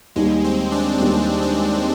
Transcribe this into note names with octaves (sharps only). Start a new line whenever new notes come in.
D#2 D#3 G3 G#3
C4
D4
D#2 D#3 G3 C4
G#3